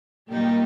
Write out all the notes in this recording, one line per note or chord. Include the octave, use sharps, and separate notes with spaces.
A#2 G3 A#3 D#4 G4